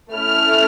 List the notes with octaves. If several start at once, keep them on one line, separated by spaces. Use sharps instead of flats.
A3 C#4 E4 F6